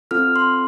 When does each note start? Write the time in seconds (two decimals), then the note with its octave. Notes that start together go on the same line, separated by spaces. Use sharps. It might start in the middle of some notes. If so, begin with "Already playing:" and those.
0.11 C4 F4 A4 F6
0.36 C6